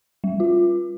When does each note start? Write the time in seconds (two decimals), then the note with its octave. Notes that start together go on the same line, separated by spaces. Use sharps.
0.24 G3
0.40 F4